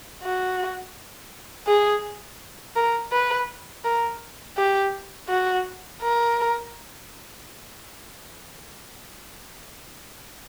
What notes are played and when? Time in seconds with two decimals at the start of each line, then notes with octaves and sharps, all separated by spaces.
0.23 F#4
1.67 G#4
2.76 A#4
3.12 B4
3.84 A#4
4.57 G4
5.29 F#4
6.02 A#4